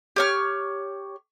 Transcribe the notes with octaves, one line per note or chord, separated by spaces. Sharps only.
G4 C#5 F6